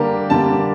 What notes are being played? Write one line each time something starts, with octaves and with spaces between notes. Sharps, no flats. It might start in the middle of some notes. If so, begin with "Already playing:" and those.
Already playing: D3 G3 A#3 G4 A#4
D3 G3 A#3 A5